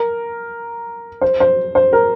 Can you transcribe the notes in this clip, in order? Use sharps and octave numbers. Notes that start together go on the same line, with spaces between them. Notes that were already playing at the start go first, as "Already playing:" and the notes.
Already playing: A#4
C5
C5
C5
A#4